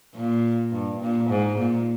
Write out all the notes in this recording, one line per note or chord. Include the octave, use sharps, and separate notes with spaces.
A#2
G2
A#2
G#2
A#2